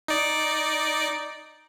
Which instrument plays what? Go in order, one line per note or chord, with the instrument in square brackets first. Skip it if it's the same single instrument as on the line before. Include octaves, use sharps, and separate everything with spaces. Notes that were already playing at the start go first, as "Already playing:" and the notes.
[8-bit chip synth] D#4 D5